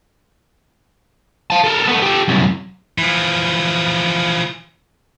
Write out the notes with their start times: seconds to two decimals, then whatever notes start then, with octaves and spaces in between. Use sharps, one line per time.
1.50 F5 A5
1.64 A4 A#4
1.87 A3 B3
2.02 G4 A4
2.28 C2 F#2
2.98 E3 F3